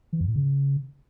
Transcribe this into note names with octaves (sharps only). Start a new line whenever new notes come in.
E3
F2
A2
C#3